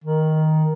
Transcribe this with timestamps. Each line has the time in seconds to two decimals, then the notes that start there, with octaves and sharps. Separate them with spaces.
0.04 D#3